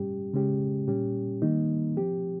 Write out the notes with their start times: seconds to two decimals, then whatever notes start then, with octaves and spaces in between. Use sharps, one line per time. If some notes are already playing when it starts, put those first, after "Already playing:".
Already playing: G2 G3 C#4 G4
0.33 C#3 G#3 C#4 G4
0.87 A#2 G3 C#4 G4
1.42 D#3 G3 A#3 D#4
1.97 F3 C4 G4